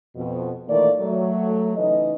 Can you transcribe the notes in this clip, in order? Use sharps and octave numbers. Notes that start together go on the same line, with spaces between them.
F2 B2
A#2 D#3 E3 A3 A#3 D5
F#3 A3
C#3 E3 D#4 D#5